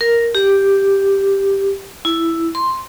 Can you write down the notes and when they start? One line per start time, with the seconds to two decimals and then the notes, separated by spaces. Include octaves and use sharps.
0.01 A#4
0.35 G4
2.05 E4
2.55 C6